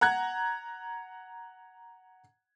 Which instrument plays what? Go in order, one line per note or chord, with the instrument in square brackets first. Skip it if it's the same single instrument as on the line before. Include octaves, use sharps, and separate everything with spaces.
[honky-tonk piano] F#5 A#5 F#6 G#6